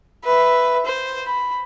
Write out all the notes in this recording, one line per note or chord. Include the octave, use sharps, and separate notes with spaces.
B4 E5
C5
B5